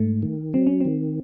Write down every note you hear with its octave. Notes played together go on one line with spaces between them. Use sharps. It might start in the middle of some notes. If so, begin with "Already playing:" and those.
Already playing: G#2 A3
D#3
F#3 C4
C#4
D#3 C4